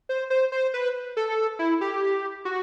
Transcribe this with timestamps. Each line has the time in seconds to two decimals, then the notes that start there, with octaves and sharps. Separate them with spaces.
0.09 C5
0.30 C5
0.52 C5
0.74 B4
1.17 A4
1.59 E4
1.81 G4
2.45 F#4